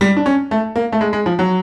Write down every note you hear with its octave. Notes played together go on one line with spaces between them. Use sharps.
G3
D4
C#4
A3
A#3
A3
G#3
G#3
F3
F#3